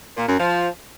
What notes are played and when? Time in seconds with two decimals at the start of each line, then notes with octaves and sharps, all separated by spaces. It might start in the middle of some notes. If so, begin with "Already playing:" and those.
0.17 A#2
0.28 F#2
0.39 F3